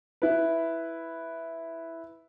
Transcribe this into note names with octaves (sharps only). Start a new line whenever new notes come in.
E4 B4